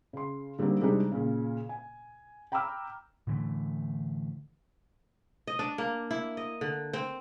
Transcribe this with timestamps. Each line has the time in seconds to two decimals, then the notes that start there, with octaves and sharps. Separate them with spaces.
0.13 C#3 C6
0.59 D3 G3 A#3 C4 D#4
0.81 C3 G3 G#3 D4 D#4
1.12 A#2 C#3
1.69 G#5
2.52 G5 A#5 B5 D6 E6 F6
3.27 A2 D3 E3 A3
5.47 D#5
5.59 D4
5.78 A#3
6.11 E4
6.37 D#5
6.61 D3
6.93 C4